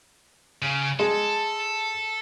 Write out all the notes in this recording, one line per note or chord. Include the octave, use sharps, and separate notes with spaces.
C#3
G#3 A4